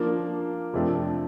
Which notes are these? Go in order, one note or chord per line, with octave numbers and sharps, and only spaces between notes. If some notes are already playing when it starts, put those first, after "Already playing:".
Already playing: F3 A#3 D4
F2 C3 F3 A3 D4